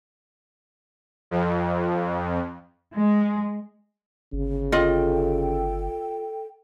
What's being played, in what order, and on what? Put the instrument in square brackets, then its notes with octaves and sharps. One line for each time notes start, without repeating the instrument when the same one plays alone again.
[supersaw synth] F2
[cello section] G#3
[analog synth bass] G1 [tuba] C#3
[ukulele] F4 D#5 [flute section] A4 G5